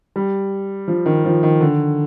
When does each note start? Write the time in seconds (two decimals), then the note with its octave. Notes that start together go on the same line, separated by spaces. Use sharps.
0.16 G3
0.88 F3
1.06 D#3
1.25 F3
1.43 D#3
1.61 D3